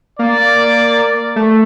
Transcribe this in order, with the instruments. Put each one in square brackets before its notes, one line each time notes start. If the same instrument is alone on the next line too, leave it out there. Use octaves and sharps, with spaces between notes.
[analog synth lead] A#3 [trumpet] D5
[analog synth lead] A3